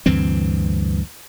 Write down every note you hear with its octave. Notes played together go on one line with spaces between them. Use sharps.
D2 G2 E3 C4